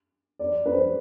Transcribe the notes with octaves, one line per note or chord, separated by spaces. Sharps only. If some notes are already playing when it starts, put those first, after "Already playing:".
D5
B4
C5